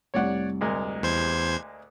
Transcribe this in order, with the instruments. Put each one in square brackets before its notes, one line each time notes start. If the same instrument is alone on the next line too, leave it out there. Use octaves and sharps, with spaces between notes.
[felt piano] F1 C2 [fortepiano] C#5 D5 F#5
[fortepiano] D2 G#3 A#4
[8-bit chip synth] E2 C5 G#6